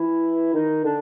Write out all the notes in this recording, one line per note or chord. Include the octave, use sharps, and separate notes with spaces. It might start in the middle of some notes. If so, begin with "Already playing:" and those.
Already playing: E3 E4
D#3 D#4
D3 D4